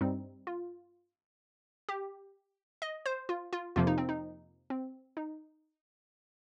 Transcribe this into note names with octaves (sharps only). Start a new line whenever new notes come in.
G2 G3 C4 D#4
F4
G4
D#5
C5
F4
F4
F2 C3 F3 A#3 F4
D#4
C4
D#4
C4
D#4